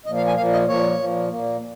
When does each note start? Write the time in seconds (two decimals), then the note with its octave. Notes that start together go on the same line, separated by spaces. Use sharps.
0.06 A#2 F3 A#3 D#5
0.17 F5
0.27 G#5
0.37 A#2 F3 A#3 F5
0.53 D#5
0.67 A#2 F3 A#3 C#5
0.99 A#2 F3 A#3
1.30 A#2 A#3